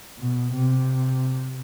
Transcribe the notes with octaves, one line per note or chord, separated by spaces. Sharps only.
B2
C3